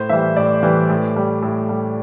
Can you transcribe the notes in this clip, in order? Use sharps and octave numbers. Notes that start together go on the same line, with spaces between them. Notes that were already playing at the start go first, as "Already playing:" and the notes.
Already playing: A2 C5
E3 G3 E5
A2 D5
E3 G3
A2
G3
A2
G3